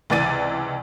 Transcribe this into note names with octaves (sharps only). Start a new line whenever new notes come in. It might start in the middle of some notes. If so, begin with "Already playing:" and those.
C#2 C3 E3 D5 A6 D#7